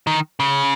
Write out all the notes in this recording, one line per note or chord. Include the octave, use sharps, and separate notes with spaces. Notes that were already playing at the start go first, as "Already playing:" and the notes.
D#3
C#3